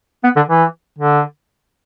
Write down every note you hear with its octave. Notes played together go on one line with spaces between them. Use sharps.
B3
D3
E3
D3